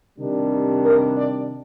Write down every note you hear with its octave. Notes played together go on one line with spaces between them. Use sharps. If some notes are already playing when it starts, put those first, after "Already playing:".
C3 D#3 G3 D4
A#4
D5